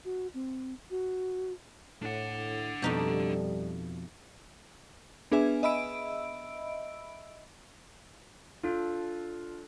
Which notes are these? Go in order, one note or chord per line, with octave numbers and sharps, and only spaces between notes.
F#4
C4
F#4
A2 D4 F#5
F2 B2 G3 A3 D#4 G4
B3 D4 G#4 B4 E5 G#5
D#5 E5 B5 E6 D7
D4 F4 A4 F#6